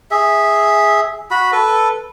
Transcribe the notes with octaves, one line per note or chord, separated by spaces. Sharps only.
G#4 E5
F#4 B5
A4 B4